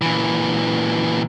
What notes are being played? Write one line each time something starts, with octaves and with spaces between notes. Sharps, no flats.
A#2 E3